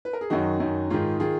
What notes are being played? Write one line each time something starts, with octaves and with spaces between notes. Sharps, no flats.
B4
A#4
G#4
F#2 D#3 D#4 F#4
F#2 D#3
G#2 D#3 F4 G#4
D#3 F4 G#4